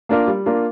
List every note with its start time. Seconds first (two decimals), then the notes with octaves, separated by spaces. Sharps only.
0.09 A#3 D4 F4 A#4
0.27 G3
0.46 A#3 D4 F4 A#4